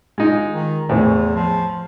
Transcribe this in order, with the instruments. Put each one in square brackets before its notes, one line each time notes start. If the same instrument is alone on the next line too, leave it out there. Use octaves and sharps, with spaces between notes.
[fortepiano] G#3 D#4 F4
[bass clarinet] D#3
[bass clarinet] E2 [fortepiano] A2 E3 C4
[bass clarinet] F3